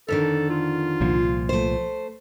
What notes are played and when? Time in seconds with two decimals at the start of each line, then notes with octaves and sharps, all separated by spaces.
0.08 F2 D3 D#3 A4
0.50 F4
1.01 C2 A#2 F3
1.49 A3 C5